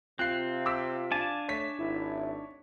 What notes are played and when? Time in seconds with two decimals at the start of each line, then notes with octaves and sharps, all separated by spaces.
0.19 C3 C4 F4 F#6 C7
0.66 D6 E6 B6
1.11 D4 F5 G#5 A5
1.49 A3 C#5 B6
1.79 G#1 E4